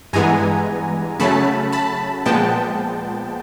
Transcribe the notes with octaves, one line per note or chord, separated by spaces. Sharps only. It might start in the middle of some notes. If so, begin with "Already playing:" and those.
G2 E3 G#3 B3 G#5 A#5
C#3 F#3 A3 C#4 A5 B5
A5 B5
A#2 F3 G#3 B3 G5 A5